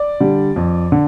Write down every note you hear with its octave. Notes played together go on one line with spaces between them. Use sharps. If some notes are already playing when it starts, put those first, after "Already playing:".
Already playing: D5
D3 G3
F2
D3